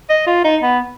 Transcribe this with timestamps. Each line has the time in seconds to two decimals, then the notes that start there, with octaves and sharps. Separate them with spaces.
0.10 D#5
0.27 F4
0.44 D#4
0.63 B3